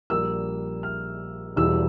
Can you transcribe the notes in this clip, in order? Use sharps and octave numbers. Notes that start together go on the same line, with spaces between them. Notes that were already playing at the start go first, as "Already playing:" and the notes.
A#1 A#2 G3 A#3 E6
F6
E1 E2 E3 G3 E6